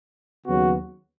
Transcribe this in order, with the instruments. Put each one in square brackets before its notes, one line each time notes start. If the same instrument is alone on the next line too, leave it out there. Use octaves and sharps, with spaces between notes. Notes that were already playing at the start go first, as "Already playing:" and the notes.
[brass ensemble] D#2 C#3 F#3 B3 F#4